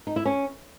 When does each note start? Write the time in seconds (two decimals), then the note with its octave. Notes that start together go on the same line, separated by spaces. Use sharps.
0.07 D#4
0.16 E4
0.26 C#4